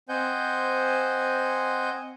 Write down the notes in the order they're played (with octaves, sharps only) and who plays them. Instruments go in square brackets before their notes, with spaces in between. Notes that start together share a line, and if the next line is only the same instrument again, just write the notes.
[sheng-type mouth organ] C4 C5 D#5 F#5 G#5 G6